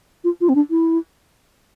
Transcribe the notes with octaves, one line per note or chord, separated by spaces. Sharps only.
F4
F4
C4
D4
E4